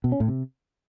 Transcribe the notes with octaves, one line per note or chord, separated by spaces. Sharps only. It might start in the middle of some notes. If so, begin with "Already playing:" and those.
B2
C#4
A2
C3